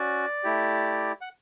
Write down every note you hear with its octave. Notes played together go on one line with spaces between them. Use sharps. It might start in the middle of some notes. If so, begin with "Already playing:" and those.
Already playing: C#4 F#4 D5
A3 E4 G4
F#5